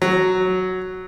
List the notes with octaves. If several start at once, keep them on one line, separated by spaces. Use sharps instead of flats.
F#3